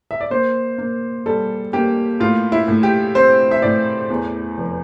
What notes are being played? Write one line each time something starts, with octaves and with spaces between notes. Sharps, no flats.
E5
D5
A#3 C5
A#3
G3 A4
A#3 G4
A2 F4
E4
A2
G4
C4 C5
E5
A2 D5
E2
F1